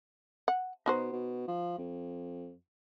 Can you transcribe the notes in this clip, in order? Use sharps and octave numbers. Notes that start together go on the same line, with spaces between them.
F#5
B2 D#4 F#4 C5
B2
F3
F2